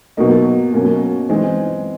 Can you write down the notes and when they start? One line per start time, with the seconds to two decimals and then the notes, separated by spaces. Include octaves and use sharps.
0.17 B2 F#3 A#3 D#4
0.73 B2 F#3 A#3 C#4
1.29 E3 G#3 C4